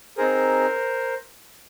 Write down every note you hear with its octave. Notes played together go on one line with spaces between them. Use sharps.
C4 D#4 G#4 A#4 C5